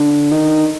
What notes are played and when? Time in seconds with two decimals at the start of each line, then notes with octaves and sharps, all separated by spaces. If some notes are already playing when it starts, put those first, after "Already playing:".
Already playing: D3
0.31 D#3